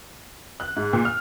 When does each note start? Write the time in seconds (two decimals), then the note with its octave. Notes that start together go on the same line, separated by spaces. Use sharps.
0.60 F#6
0.76 G#2
0.93 A#2
1.05 F6